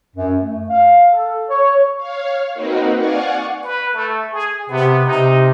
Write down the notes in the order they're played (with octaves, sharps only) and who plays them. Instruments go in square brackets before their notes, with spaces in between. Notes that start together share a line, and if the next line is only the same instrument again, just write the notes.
[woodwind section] F#2
A3
F5
A4
C#5
[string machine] C#5 F5
A#3 C4 D#4 F#4 A#4 B4
D5 F5 F#5 G#5 C#6
[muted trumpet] B4
A3
G#4
[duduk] C3 [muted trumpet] B3
[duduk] C3 [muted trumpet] D#4